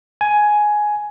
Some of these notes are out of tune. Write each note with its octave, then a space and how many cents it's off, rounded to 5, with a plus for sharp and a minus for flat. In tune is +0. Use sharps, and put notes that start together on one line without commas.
G#5 +10